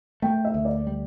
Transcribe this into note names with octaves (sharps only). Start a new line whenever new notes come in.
A3 G5
E5
D2
D5
G3